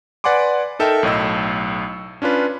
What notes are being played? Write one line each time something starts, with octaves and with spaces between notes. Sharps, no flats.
B4 D5 F#5 G#5 C6 D6
D#4 A4 A#4 E5 G5
B1 A2 D#5 E6
C#4 D4 F4 B4